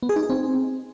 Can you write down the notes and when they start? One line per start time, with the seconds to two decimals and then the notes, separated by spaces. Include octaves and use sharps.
0.03 B3
0.09 G#4
0.16 D#4
0.23 G#4
0.30 C4